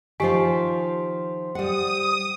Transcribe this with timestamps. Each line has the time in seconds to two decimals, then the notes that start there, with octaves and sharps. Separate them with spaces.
0.20 D#3 F3 F4 G4 C5 G#5 B6
1.55 G3 F#5 D#6